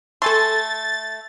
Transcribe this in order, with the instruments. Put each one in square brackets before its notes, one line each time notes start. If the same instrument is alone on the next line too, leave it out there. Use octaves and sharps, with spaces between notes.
[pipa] A3 [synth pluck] A4 G#5 C6 [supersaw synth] A6